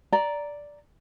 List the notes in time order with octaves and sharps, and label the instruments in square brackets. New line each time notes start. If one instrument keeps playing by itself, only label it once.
[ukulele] D5 A#5